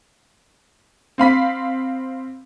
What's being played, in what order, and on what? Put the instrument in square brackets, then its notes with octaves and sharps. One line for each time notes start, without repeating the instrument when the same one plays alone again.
[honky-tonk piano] C4 F5 B5 B6